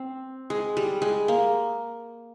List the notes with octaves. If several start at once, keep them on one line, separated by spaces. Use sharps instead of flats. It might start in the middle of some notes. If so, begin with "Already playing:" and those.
Already playing: C4
G#3
G3
G#3
A#3